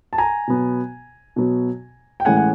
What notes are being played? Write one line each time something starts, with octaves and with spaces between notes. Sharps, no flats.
A5
G#5 A#5
B2 F#3 B3
B2 F#3 B3
G5
A2 E3 G#3 C#4 F#5 G#5
F#5